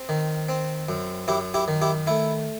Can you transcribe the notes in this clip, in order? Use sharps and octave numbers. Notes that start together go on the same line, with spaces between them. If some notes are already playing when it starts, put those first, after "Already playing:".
Already playing: C4
D#3
C4
F#2
F#2 E4 G4
E4 G4
D#3
E4 G4
A3 E4